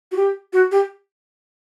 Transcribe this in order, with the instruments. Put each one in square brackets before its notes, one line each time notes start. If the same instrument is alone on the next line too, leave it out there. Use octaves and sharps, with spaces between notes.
[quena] F#4
G4
F#4
G4